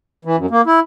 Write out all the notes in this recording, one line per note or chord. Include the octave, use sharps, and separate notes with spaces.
E3
F#2
A#3
E4